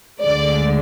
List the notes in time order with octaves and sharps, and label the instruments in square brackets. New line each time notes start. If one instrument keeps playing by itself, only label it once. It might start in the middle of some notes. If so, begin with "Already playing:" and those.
[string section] D2 D3 G#3 D5